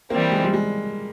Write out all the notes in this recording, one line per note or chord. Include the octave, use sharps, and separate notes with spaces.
E3 G3 A#3 C4
G#3
G3
G#3